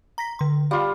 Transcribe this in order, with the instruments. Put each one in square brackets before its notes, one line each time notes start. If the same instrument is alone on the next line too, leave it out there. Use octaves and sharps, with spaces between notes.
[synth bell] A#5 A#6 B6
D3 C6
[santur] G3 F4 [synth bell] F5